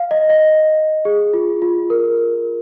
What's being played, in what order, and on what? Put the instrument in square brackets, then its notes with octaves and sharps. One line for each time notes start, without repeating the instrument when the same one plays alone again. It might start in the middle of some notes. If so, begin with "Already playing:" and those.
Already playing: [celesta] F5
D#5
D#5
G#4
F4
F4
A#4